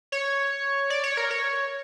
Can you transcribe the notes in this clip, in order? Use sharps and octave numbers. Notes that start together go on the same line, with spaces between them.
C#5
D5
C#5
A#4
C#5